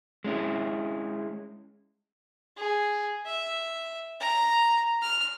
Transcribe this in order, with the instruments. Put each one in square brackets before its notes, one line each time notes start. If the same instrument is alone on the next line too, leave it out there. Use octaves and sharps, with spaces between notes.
[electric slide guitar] G#3 C#4 E4
[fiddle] G#4
E5
A#5
F6